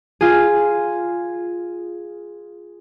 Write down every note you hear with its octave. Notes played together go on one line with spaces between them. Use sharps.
F4 G#4